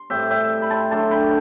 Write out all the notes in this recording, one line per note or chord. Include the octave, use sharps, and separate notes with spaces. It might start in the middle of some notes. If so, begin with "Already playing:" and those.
Already playing: C6
A2 G3 C4 E5 G5
E5 G5
B5
A5 C6
D3 F#3 A3 D4 A5 C6
G5 B5